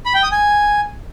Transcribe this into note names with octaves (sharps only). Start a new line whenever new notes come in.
B5
G5
D#6
G#5